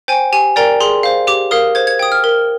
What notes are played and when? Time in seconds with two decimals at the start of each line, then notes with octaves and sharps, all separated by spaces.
0.08 C5 G5 G#5
0.32 G4 G#5
0.56 A#4 D5 G5 A#5
0.80 G#4 C6
1.03 C5 F5
1.27 G4 D6
1.51 A#4 F5 D#6
1.75 C5 G#6
1.87 G#6
1.99 G5 D#6
2.12 F6
2.24 A#4